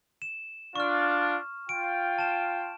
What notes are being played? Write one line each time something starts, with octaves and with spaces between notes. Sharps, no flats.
E7
D4 F4 C#6 F6
F4 G5 D7
A5 E7